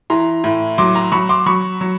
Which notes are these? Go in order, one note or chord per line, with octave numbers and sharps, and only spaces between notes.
E3 A#5 C6
A2
F#3 C6 D6
A#5 C6
F#3 B5 C#6
C6 D6
F#3 B5 C#6
F#3